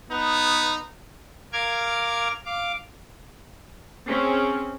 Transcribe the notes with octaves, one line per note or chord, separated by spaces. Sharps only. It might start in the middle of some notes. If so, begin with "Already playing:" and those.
B3 D#4
A#4 F5 D6 F6 G#6
F5 D6
C4 C#4 G#4